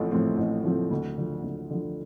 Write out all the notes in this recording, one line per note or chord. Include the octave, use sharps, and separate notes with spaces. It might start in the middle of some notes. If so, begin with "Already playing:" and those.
Already playing: A1 A2 F3 A3 C4
A2 F3 A3 C4
A1
A2 F3 A3 C4
D2
D3 F3
D2
D3 F3